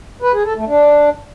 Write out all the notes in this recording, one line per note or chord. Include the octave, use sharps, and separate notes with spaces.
B4
G#4
A4
A3
D4